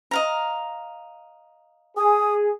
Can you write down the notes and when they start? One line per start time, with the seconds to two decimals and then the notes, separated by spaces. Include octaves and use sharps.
0.11 D#5 F5 A#5
1.97 G#4 D#6